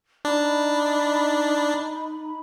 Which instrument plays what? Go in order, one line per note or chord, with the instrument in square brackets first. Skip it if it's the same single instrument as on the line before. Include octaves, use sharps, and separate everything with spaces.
[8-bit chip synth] D4 [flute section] D#4 B5